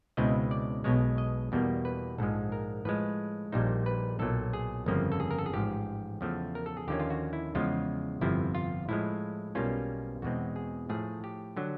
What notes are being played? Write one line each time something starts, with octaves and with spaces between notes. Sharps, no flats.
C#2 B2 G#3 C4 E4 D#5
D5
B1 B2 G#3 C#5
D#5
E2 B2 G3 A#3
B4
A#1 G#2 F3 G#3 A4
A#4
A2 F3 G#3 B4
A#1 A#2 G3 A#3 D#4 C5
B4
B1 A#2 F#3 A4
G#4
G1 F2 C#3 F3 A#3
A4
G#4
A#4
A4
G#4
A1 G#2 F3 G4
E2 C#3 F3 A3
A#4
A4
G#4
D#2 D3 F3 A#3 C#4 G4
F4
F#4
E4
E2 C#3 F3 G#3 F4
G1 F2 C3 F3 E4
F4
A2 F3 G#3 E4
B1 B2 G3 A#3 C#4 F4
E2 B2 G#3 C4 F#4
G#4
A2 F3 A3 G#4
G4
D3 F#3